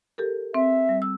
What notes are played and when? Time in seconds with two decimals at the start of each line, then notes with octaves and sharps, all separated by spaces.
0.18 G4 A4 A#4
0.54 C4 E5
0.89 G3
1.02 E6